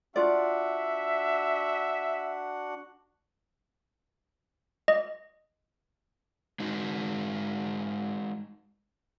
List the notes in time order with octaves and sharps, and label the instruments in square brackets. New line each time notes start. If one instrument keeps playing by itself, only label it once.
[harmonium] D4 F#4 F#5 [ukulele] F4 D5 [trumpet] E5
[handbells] D#5
[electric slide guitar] G#3 D#4 F#4